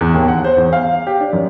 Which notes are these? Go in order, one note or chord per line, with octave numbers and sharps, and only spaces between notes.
E2
D#2
F#5
C5
E2
F5
G4
D4
F#2